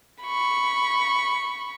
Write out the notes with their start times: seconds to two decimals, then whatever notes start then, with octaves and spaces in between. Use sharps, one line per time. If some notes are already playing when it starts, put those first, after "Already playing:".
0.23 B5 C#6